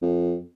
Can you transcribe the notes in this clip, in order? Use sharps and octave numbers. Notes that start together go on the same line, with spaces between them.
F2